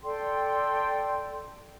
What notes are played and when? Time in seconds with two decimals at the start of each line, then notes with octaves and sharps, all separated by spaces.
0.03 A4 D5 G5 C6